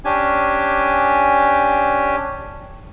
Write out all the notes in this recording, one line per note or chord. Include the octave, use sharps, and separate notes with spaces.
C#4 D4 G4 G#5